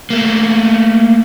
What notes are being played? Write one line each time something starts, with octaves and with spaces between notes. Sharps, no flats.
A3 A#3